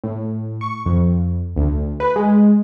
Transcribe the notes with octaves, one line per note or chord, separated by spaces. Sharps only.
A2
C#6
F2
D2
B4
G#3